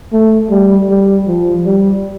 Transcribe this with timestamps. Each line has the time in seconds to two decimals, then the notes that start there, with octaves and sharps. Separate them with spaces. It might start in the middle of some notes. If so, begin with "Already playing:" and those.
0.12 A3
0.50 G3
0.89 G3
1.27 F3
1.65 G3